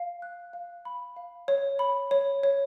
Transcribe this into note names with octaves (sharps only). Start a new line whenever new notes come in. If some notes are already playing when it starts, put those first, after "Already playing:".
Already playing: F5
F#6
F5
B5
F5
C#5
B5
C#5
C#5